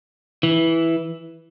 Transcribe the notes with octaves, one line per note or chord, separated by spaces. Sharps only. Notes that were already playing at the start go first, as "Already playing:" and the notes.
E3